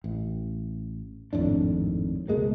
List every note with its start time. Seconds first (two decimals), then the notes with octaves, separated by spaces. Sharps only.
0.04 A1
1.33 G#1 F2 A2 D4
2.28 C#2 B2 G#3 A#3